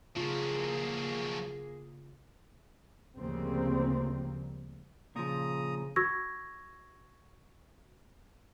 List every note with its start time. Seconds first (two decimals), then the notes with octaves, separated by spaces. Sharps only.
0.17 C#3 F3 F#3 A#3 F4 G#4
3.19 D2 C#3 F3 G3 A#3 C4
5.16 A#2 C#3 F3 A#5 D#6
5.96 F#4 C#6 E6 G#6 A#6